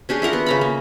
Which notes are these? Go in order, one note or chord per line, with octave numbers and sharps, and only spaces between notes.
C#4 D4 G4 G#4
E4 F4 A#4 F#5
B3
C#3 A#5 B5
A#3